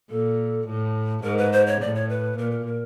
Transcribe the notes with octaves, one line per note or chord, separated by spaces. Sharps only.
A#2 A4
A2
G#2 A#4
B4
C5
C#5
A2 D5
C#5
B4
A#2 A#4
A#4
A#4